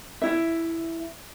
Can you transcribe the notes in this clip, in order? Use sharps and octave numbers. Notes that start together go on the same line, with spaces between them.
E4 E5